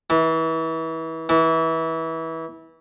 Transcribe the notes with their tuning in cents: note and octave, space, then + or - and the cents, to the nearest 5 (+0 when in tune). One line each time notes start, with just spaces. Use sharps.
E3 -30
E3 -25